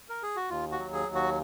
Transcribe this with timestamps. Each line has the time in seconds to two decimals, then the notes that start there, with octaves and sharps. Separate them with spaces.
0.09 A#4
0.23 G#4
0.36 F#4
0.50 D#2 F4
0.72 F#4
0.79 F#3
0.93 G#4
1.08 D#2
1.15 F#4